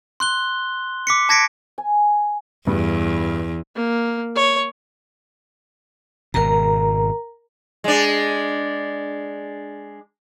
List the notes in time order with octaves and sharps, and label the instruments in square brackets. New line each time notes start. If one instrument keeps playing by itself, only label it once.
[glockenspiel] C6 F#6 G7
D6 B6 C#7
A5 G#6 A#6 B6 C#7 D7
[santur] G#5
[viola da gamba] E2 [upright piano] G2
[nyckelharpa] A#3
C#5
[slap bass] G#1 B2 [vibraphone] A#4 A#5
[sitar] G#3 D4